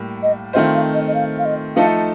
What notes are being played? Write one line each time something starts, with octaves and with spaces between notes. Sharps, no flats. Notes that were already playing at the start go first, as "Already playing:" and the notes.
Already playing: A2 G3 A#3
D#5
D#3 A3 C4 F4 C5 D#5
F5
D#5
D#5
F5
F5
D#5
F3 A3 D#4 A4 F5